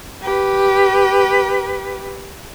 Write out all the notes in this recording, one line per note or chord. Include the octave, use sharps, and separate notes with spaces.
G4 B4